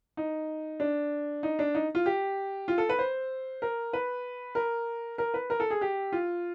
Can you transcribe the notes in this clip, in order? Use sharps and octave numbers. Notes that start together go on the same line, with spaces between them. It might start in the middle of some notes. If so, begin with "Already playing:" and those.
D#4
D4
D#4
D4
D#4
F4
G4
F4
A4
B4
C5
A#4
B4
A#4
A#4
B4
A#4
A4
G#4
G4
F4